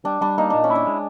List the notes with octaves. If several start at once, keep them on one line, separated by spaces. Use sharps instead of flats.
G3 D4
G3 D4
A#3 D#4
A#2 D4
C#4
E4
D4
G#3